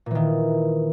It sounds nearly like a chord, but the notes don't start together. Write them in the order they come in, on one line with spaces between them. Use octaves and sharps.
A#2 E3 D#3